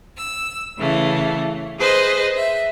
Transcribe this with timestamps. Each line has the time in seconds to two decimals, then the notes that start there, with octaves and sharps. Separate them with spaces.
0.16 E6
0.78 C#3 E3 A3
1.78 G#4 B4 C5 D#5
2.34 E5